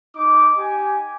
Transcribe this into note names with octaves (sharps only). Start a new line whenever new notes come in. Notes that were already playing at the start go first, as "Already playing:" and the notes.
D#4 D6
G4 G#5